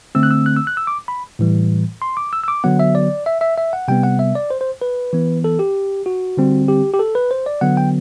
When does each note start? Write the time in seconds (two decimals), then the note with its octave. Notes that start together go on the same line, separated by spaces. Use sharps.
0.15 D3 A3 C4 E6
0.23 F#6
0.31 E6
0.46 F#6
0.56 E6
0.67 F#6
0.77 E6
0.87 D6
1.08 B5
1.39 A2 E3 G3
2.02 C6
2.17 D6
2.33 E6
2.44 E6
2.48 D6
2.64 D3 F#3 B3 F#5
2.79 E5
2.95 D5
3.26 E5
3.41 E5
3.58 E5
3.73 F#5
3.88 C3 G3 B3 G5
4.03 F#5
4.19 E5
4.35 D5
4.50 C5
4.61 C5
4.81 B4
5.13 E3 B3
5.44 A4
5.59 G4
6.06 F#4
6.37 D3 G3 C4
6.68 G4
6.94 G4
6.99 A4
7.15 B4
7.31 C5
7.46 D5
7.61 D3 F#3 B3 F#5
7.77 G5